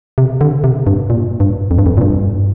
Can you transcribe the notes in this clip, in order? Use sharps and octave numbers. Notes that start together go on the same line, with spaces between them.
C3
D3
C3
G2
A#2
G2
F2
G2
F2
A#2
G2